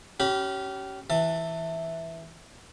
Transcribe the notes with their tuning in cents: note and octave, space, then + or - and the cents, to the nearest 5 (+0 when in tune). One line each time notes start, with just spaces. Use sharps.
C#4 +10 G4 -35 B5 -10
E3 -5 A5 +25